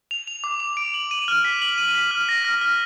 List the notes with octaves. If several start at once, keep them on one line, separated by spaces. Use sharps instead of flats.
F7
F7
D6
F7
D7
F#7
D#7
F6
B6
F#7
D#7
B6
F6
A#6
F6
F6